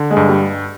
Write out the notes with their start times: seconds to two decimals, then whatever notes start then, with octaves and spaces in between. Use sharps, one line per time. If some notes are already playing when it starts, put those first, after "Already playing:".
Already playing: D3
0.11 G#3
0.17 G2
0.29 G3